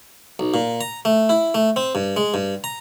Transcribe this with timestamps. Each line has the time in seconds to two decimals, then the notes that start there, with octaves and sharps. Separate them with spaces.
0.39 B1
0.54 A#2
0.81 A#5
1.05 A3
1.29 E4
1.54 A3
1.76 C4
1.95 G2
2.16 G#3
2.34 G2
2.64 A#5